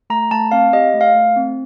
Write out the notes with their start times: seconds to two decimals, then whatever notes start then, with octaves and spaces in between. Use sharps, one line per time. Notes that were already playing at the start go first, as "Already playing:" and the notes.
0.10 A3 A#5
0.31 A3 A5
0.52 C4 F5
0.73 G4 D#5
0.94 A3
1.01 F5
1.15 A3
1.36 C4